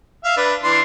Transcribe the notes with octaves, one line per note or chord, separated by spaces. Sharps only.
E5 F5
D4 B4
E3 D4 C6